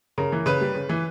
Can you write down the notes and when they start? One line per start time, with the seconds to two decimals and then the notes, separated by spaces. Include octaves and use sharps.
0.18 C#3 A#4
0.32 E3
0.46 C#3 B4
0.61 G3
0.75 C#3
0.89 E3